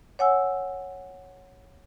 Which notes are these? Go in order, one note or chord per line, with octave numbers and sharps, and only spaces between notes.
C#5 F#5 G#5 E6